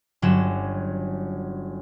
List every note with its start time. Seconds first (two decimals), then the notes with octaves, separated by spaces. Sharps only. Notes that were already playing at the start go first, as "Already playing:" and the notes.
0.22 G1 F#3 C#4 E7